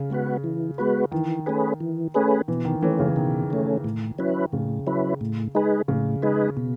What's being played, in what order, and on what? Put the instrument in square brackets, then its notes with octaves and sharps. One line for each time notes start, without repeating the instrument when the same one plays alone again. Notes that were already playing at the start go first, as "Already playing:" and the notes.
Already playing: [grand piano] C#3
[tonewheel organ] G#3 B3 F#4 B4
E3
G#3 B3 F#4 B4
[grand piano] D#3 [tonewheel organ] E3
[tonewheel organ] A3 C#4 G#4 B4
E3
A3 C#4 G#4 B4
[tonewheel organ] B2 [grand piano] E3
[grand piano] D#3
[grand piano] E3 [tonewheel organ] A3 C#4
[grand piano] C#3
[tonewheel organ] B2 [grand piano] D#3
[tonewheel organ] A3 C#4
A2
F#3 C#4 E4 B4
[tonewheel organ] A2 [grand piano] C#3
[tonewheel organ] F#3 C#4 E4 B4
A2
G#3 D#4 G#4 B4
[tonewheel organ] A2 [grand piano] C#3
[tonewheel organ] G#3 D#4 G#4 B4
B2